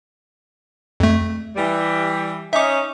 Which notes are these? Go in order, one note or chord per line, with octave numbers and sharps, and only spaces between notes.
F2 A3
E3 G3
C#4 D#4 E5 D6